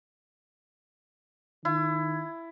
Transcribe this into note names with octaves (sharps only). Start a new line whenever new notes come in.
D#3 E4